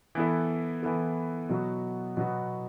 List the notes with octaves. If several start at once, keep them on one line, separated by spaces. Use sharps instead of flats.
E3 B3 E4 A4
E3 B3 E4 A4
B2 F#3 B3 F#4
B2 F#3 B3 F#4